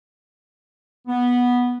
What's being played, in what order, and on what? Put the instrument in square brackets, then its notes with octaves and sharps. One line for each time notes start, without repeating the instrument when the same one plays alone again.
[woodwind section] B3